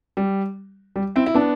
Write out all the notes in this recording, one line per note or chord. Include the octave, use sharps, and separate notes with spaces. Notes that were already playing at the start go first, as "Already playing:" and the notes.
G3
G3
C4 E4
E4
B3 D4